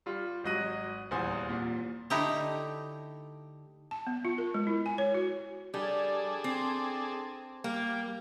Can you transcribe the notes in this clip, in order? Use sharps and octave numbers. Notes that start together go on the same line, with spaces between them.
G3 F4
G#1 F#3 D#5 F#6 D#7
D#1 E2 C5 G#5 D#6
A#2
D3 A3 D#4 E4 G4
A5
B3
F4
A#4
G#3
E4
G#5
C#5
F#4
G3 D4 G#4 A4
C4
G3 A#3